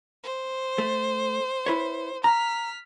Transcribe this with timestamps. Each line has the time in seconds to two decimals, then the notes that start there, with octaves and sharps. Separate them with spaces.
0.24 C5
0.78 A3
1.66 E4 B4 C#5
2.24 A#5 F6 B6